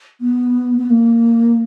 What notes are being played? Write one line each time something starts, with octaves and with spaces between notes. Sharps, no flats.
B3
B3
A#3